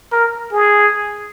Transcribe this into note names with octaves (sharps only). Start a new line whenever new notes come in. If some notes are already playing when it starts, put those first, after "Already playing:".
A#4
G#4